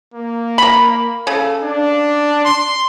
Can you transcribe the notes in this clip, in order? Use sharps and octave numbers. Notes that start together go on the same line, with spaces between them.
A#3
A#4 B5
C#3 A4
D4
C6